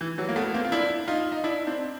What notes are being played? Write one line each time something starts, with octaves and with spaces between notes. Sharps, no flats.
E3
E3 F#3
A#3
A3 B3
A#3 C4
F4
D4 E4
D#4 F4
D#4
D4 E4
C4 D4